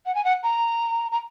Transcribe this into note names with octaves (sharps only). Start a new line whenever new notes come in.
F#5
G#5
F#5
A#5
A#5